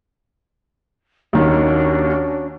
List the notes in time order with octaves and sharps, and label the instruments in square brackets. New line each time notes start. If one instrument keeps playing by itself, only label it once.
[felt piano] D#2 D#3 [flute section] C#4 D4 F#4